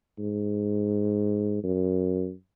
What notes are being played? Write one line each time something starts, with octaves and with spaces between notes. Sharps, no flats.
G#2
F#2